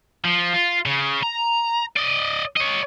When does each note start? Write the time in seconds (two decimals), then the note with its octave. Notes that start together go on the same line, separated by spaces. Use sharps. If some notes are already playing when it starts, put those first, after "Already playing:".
0.25 F3
0.53 F4
0.86 C#3
1.23 A#5
1.97 D5 D#5
2.56 C#5 D#5